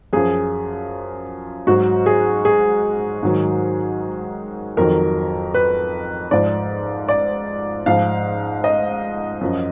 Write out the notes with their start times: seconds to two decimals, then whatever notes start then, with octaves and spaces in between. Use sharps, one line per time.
0.13 F#2 F3 G#4
1.67 G#2 F#3 F#4
2.06 G#4
2.45 G#4
3.23 G#2 D#3 F#3
4.77 F2 D#3 F#3 A#4
5.54 B4
6.31 G#2 F3 D5
7.09 D5
7.86 G#2 F3 F5
8.64 D#5
9.41 F#2 F3